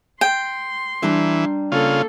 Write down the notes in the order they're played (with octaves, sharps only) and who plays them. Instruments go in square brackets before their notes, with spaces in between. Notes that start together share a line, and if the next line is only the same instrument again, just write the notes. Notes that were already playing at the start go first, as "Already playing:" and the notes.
[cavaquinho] G5 [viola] C6
[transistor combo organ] E3 [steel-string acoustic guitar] G3 D4 A#5
[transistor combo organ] C#3 F4 [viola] A#3 A4